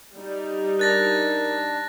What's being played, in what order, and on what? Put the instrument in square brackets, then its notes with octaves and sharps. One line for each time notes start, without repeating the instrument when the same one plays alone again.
[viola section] G3 D#4
[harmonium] D4 [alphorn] A#4 [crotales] F#6 A6 A#6